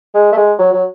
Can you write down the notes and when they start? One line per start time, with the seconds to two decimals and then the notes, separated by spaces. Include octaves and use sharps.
0.14 G#3
0.32 A3
0.37 G#3
0.59 F#3
0.73 F#3